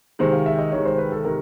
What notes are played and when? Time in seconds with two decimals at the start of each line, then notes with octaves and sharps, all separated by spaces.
0.19 C3 D#3 G#3 C5
0.33 F5
0.46 E5
0.59 D#5
0.72 C3 D#3 G#3 C#5
0.85 C5
0.98 B4
1.12 A4
1.25 C3 D#3 A#4